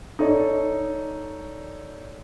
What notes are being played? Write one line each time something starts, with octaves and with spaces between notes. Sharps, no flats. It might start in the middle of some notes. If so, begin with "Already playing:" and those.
D#4 A4 C#5 D5